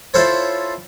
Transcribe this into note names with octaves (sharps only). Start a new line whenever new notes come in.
E4 F4 A4 C5 C#5